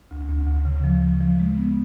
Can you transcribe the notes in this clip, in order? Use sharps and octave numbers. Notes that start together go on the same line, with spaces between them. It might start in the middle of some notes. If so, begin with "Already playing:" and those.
D2
D2
D2
C#3
F3
F3
F3
G#3
B3